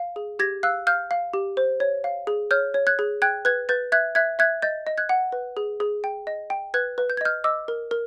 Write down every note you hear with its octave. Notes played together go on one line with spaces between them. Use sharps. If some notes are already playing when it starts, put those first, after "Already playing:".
Already playing: F5
G#4
G4 G#6 A#6
F5 E6 F#6
F5 F6 G6
F5
G4
C5
C#5
F5
G#4
C#5 F6 G6
C#5
F#6 G#6
G#4
G5 F#6 G#6
B4 F#6 G#6
B4 G6 A6
E5 F#6 G#6
E5 F#6 G#6
E5 F#6 G#6
D#5 G6 A6
D#5
F#6 G#6
F#5
B4
G#4
G#4
G5
D#5
G5
B4 F#6 G#6
B4
G6
G#6
D#5 F6 G6
D#5 D6 E6
A#4
A#4